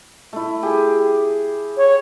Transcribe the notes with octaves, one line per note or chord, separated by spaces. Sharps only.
A3 E4
G4 G#4
C#5